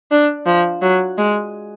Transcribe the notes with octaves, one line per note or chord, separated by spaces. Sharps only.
D4
F3
F#3
G#3